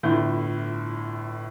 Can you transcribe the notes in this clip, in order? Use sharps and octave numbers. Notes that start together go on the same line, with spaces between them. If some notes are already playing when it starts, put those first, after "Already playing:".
G1 A2 E4 F4 G6